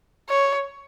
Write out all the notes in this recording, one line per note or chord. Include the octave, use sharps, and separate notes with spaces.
C#5